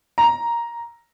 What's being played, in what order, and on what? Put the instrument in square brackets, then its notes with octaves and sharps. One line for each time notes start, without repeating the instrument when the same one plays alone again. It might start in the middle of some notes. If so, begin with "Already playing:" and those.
[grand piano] A#5